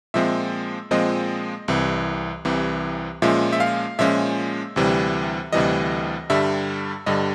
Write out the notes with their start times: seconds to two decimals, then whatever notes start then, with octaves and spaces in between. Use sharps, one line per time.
0.14 A#2 F3 G#3 C4 E5
0.91 A#2 F3 G#3 C4 D#5
1.68 C2 C3 E3
2.45 C2 C3 E3
3.22 A#2 F3 G#3 C#4 E5
3.53 E5
3.60 F5
3.99 A#2 F3 G#3 C#4 E5
4.76 D2 C3 E3 G3
5.52 D2 C3 E3 G3 D#5
6.30 G2 D3 G3 E5
7.06 G2 D3 G3 D#5